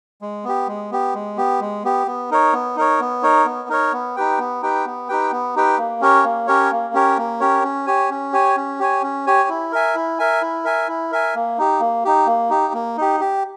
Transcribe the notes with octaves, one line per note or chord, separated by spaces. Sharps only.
G#3
B3 G4
G#3
B3 G4
G#3
B3 G4
G#3
B3 G4
B3
D#4 A#4 C#5
B3
D#4 A#4 C#5
B3
D#4 A#4 C#5
B3
D#4 A#4 C#5
B3
D#4 G4 B4 G5
B3
D#4 G4 B4 G5
B3
D#4 G4 B4 G5
B3
D#4 G4 B4 G5
A#3
C#4 G4 A#4 C#5
A#3
C#4 G4 A#4 C#5
A#3
C#4 G4 A#4 C#5
A#3
C#4 G4 A#4 C#5
C#4
G4 C#5 G#5
C#4
G4 C#5 G#5
C#4
G4 C#5 G#5
C#4
G4 C#5 G#5
E4
A#4 E5 G#5
E4
A#4 E5 G#5
E4
A#4 E5 G#5
E4
A#4 E5 G#5
A#3
D#4 G4
A#3
D#4 G4
A#3
D#4 G4
A#3
D#4 G4
G4